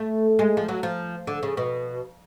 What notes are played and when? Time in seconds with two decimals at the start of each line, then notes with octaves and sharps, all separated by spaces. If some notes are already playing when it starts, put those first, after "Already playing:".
Already playing: A3
0.39 G#3
0.57 F3
0.69 F#3
0.83 F3
1.27 D3
1.43 C#3
1.57 B2